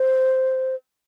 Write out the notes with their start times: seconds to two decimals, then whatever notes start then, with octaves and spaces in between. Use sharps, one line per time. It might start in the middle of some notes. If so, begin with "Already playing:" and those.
Already playing: C5